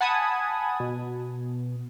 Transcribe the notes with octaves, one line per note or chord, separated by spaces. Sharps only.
F#5 G#5 A5 B5 D#6 G#6
B2